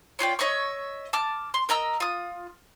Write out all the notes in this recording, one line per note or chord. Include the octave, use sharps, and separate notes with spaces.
C#4 F4 D5 G5
C#5 D#5 E5 C#6
A5 D6 F6
C6
A#4 D#5 A#5 E6
F4 D#6